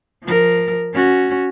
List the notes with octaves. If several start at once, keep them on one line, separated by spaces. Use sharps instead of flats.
F3 A#4
C#4 F#4